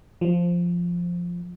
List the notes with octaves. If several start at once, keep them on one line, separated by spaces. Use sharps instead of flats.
F3